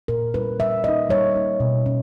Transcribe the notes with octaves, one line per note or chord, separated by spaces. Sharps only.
A#2 A#4
G3 C#4 E4 B4
G3 E5
A#3 D#4 D#5
G3 C#5
A#3 D#4
B2
C#4